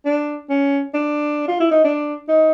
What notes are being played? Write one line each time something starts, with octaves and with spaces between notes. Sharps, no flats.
D4
C#4
D4
F4
E4
D#4
D4
D#4